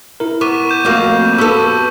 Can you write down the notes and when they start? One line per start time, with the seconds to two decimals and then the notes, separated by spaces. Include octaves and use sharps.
0.20 E4 A#4
0.41 B3 C#6 D6 D#7
0.69 G6 E7
0.85 F2 A3 A#3 F#4 F5
1.38 B3 F#4 A4 B4 C#6 E6